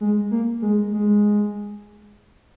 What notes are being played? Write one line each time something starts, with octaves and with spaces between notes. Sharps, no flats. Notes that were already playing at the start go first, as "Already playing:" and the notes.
G#3
A#3
G#3
G#3